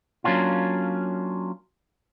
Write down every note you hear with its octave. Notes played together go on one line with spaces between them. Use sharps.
F#3 A#3 C#4 D4 F4